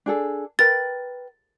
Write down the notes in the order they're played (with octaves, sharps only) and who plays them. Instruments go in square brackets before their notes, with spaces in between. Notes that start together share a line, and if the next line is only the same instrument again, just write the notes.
[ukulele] D4 G#4 A4
[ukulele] A#4 B4 G5 [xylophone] A6